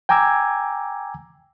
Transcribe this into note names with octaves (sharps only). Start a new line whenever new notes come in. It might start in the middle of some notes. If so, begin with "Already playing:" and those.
G5 G#5 A#5 D6 E6 G#6